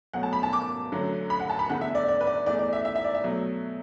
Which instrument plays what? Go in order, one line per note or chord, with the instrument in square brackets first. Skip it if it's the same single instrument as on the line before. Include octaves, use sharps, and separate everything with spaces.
[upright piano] B2 F#3 A3 F#5
A5
B5
A5
D6
F#2 D3 F#3 A3
B5
F#5
A5
B5
E2 D3 A3 F#5
E5
D5
D5
B4
D5
E2 E3 A3 D5
D5
E5
E5
E5
D5
E5
B2 F#3 A3